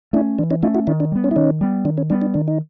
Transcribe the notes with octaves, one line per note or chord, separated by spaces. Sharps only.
A3 C#4 D4 E4
E3 D4
C#4 D#4
A3 C#4 D#4 F4
E4 F#4
D#3 D4 E4
D4
G3 B3
C#4
E4
D#3 C#4 D#4
G3 B3
D#3 D4
C#4
G3 B3 D4
D4
D#3 D4
D#4